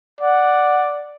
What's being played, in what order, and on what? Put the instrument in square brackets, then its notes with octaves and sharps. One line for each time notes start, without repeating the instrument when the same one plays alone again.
[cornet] D5 [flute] F#5